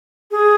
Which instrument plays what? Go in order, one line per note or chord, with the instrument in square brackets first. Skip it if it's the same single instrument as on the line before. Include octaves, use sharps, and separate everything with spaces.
[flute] G#4